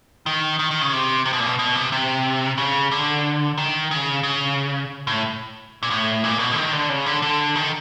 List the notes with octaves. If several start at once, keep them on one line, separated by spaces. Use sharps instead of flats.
D#3
D#3
D#3
C#3
C3
C3
B2
A#2
B2
B2
C3
C3
C#3
D3
D#3
C#3
C#3
A2
A#2
A2
A#2
B2
D3
D#3
D3
C#3
D3
D3
D#3